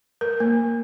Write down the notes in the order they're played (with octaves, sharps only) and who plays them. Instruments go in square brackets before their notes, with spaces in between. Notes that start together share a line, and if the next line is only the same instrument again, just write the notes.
[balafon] A#4
A#3